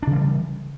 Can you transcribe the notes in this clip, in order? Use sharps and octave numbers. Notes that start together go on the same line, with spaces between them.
C#3 E3 G3 D4